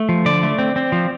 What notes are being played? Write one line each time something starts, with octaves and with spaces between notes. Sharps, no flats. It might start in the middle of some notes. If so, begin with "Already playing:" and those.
Already playing: A3
F3
D3 D5
A3
C4
C4
F3